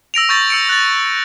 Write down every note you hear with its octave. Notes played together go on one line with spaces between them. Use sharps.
E6 A#6 D7 F7
C#6 G6 A6 A#6
E6 C#7 D7
F#6 A6